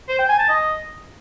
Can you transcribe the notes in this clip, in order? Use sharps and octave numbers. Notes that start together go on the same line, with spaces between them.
C5
G5
G#5
A5
D#5